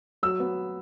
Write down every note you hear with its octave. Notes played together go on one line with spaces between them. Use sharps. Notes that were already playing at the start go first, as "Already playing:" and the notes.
F#3 E6
B3